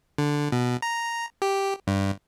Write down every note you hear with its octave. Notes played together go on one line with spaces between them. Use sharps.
D3
B2
A#5
G4
G2